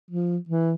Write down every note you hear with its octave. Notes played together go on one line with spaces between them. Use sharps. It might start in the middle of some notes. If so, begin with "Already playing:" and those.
F3
E3